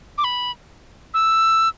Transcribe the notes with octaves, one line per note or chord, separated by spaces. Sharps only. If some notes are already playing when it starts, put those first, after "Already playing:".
D6
B5
E6